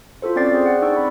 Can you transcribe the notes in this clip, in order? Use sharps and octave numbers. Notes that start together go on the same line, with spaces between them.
F4 F#4 A4 C5
C4 C#4 D5 G5 A6 C7
G#4 C5 D5
F#5
D4 D#4 D5 G5 C#6 E6
C4 B5